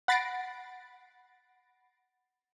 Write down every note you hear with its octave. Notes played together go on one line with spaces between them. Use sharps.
F#5 B5 A6 A#6 C7 D7